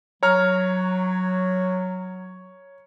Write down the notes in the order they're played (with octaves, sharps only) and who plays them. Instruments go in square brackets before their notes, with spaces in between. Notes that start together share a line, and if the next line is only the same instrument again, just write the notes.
[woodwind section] F#3 [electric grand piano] C#5 A#5 F6